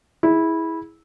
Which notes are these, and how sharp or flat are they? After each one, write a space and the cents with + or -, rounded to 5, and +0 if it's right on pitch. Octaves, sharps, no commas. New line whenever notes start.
E4 -15 G#4 +0